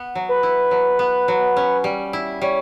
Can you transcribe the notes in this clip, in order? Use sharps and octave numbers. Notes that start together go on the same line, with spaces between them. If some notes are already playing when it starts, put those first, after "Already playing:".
Already playing: B3
F#3
B4
E4
F#3
B3
F#3
C#4
G3
E4
G3 C#5